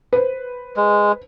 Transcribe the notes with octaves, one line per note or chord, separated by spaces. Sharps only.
B4 C5
G#3